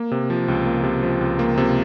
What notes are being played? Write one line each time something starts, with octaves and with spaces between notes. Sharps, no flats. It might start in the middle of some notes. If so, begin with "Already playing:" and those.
Already playing: A#3
C3
F3
C#2
A#3
C3
F3
C#2
A#3
C3